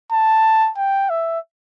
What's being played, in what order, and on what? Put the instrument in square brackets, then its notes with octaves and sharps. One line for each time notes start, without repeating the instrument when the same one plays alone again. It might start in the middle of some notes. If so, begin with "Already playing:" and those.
[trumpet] A5
G5
E5